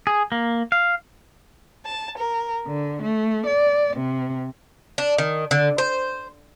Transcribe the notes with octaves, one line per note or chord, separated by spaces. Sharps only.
G#4
A#3
F5
A5
A#4
D3
A3
D5
C3
D4
D#3
D3
C5